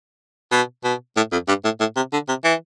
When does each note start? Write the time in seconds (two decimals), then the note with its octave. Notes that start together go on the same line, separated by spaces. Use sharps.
0.52 B2
0.84 B2
1.16 A2
1.32 F2
1.48 G2
1.64 A2
1.80 A2
1.96 C3
2.13 D3
2.28 C3
2.44 E3